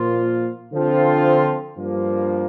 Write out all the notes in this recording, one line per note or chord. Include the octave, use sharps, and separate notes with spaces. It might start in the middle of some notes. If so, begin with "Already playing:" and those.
Already playing: A#2 F3 A#3 F4
D3 F3 C4 F4
G2 F3 A#3